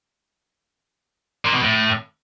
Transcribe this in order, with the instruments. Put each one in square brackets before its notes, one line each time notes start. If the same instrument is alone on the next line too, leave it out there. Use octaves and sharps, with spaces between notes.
[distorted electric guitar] A#2
B2
A2